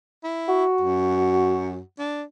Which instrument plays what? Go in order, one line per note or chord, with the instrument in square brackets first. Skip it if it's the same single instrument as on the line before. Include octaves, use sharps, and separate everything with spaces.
[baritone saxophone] E4
[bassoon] F#4
[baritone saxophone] F#2
D4